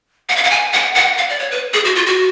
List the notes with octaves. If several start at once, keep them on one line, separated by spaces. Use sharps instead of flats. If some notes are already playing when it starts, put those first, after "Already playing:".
F#5
F5
F#5
G#5
F#5
F#5
F5
D5
C#5
B4
G#4
F#4
F4
F#4